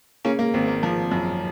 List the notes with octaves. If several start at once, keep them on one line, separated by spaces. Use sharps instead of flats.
C#3 A#3 C#4
A#3
G#1 C4
A#3
F3
F#2